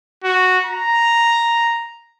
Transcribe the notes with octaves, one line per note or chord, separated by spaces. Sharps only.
F#4
A#5